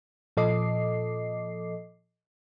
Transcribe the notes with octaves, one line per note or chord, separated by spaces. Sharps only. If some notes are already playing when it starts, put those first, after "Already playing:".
A#2 F3 A4 D#5 D6 C7